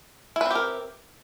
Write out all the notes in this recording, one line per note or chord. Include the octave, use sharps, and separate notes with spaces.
C4 E4 G4 A#4 B4